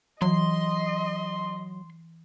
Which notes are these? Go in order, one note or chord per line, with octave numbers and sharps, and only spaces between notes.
E3 F#3 D#5 C6